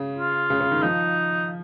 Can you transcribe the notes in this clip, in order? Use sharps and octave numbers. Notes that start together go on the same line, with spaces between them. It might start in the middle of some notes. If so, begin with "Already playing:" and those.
Already playing: C#3
F4
C#3
C#3
D#3
F3 D#4